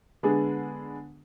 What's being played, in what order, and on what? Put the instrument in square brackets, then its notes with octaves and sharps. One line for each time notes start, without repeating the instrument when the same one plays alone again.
[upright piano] D3 G#3 B3 D4 G#4